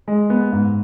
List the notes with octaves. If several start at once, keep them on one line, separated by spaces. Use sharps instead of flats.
G#3
B3
G#2